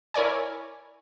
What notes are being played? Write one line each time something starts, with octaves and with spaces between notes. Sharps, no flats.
E4 A#4 C#5 D5 G#5